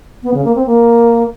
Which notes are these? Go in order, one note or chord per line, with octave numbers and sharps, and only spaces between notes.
B3
C#3
A#3
C4
A#3